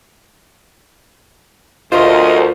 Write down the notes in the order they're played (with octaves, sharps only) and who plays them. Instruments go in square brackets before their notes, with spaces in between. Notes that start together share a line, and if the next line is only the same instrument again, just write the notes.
[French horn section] D2 [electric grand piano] F4 [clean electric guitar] A#4 C5 [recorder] D#5